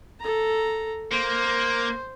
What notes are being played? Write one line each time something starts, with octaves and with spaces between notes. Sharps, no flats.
A4 A#5
A#3 C5